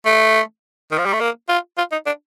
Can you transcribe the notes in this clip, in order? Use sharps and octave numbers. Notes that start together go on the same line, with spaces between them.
A3
D#3
F3
G3
A3
A#3
F4
F4
D#4
D4